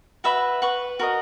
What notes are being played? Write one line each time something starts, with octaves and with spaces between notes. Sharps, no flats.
F#4 B4 E5 B5
B4 F#5 C#6
F#4 A#4 D#5